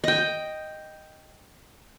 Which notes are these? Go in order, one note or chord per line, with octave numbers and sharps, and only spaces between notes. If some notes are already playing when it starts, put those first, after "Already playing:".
D#5 G5